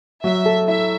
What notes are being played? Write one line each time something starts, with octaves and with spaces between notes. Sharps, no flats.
F#3 E5
A4
E4 E5